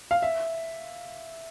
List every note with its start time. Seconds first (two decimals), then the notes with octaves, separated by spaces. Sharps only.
0.11 F5
0.22 E5